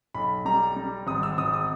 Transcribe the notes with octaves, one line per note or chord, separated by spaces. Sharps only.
B1 B5
G3 A#5
G3
G#1 D#6
E6
G#1 D#6
D#6